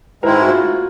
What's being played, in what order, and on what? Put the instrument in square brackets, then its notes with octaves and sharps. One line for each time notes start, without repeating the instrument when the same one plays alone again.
[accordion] G#2 D#3 G#3 C4 E4 [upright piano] A#4
[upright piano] F#4
F4